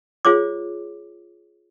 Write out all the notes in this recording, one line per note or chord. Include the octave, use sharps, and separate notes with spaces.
F4 G#4 C5 C#5 D6